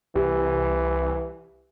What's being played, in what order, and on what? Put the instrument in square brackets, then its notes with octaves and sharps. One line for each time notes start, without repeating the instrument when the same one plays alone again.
[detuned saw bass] C2 [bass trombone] E3 [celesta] G4